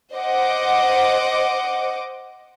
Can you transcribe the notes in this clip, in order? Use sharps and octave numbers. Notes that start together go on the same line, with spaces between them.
C5 D#5 F#5 D6